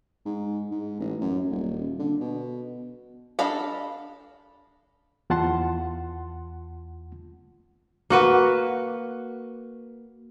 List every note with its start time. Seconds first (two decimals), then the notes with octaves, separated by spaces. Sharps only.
0.26 G#2
0.71 G#2
1.00 A1
1.21 F#2
1.50 D#1
1.99 D3
2.20 B2
3.39 D4 A4 D#5 F5 B5
5.30 E2 F4 F#5 A5 C6
8.10 A#3 F#4 B4